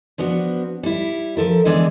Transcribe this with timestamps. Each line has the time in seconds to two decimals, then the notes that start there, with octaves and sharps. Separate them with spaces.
0.18 F3 B3 D4 F#4
0.83 G3 E4
1.37 F3 A4 A#4
1.65 D3 E3 G#3 B3 D4 G#4